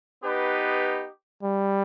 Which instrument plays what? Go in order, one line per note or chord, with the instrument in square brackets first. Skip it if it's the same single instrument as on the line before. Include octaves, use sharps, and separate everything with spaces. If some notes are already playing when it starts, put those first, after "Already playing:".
[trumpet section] B3 D#4 G4 B4
[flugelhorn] G3